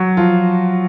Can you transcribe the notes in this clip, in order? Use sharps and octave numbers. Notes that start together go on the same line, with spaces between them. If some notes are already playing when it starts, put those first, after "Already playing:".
Already playing: F#3 F#4
F3 F4